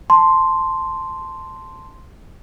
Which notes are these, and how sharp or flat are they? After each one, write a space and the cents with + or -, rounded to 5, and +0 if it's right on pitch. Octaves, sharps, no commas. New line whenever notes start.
A5 +0 C6 +0